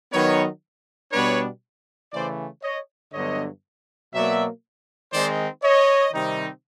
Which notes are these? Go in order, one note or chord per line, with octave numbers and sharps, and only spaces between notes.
D#3 F#3 B3 D#4 B4 C#5
B2 G3 B3 D4 B4 C#5
C#3 E3 A3 C5 D5
C#5 D#5
G2 D3 F#3 B3 C#5 D#5
B2 F#3 A#3 D5 E5
D#3 G#3 C4 D#4 C5 D5
C#5 D#5
C3 D#3 G3 C4 D#4